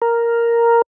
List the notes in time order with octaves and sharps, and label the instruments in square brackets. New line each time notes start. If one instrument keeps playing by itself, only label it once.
[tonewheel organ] A#4